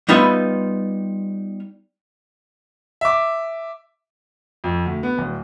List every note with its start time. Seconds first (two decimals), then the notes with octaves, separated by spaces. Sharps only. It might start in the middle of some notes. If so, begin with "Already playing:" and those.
0.09 G3 B3 D#4 F4 B4 E5
3.01 E5 D6
4.64 F2
4.86 D2
5.03 B3
5.18 D1